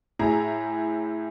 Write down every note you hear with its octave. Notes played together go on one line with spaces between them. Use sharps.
A2 E4 G#4 A#5